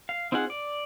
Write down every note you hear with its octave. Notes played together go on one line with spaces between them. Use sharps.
F5
C4 D#4 F4 G#4 F#5
D5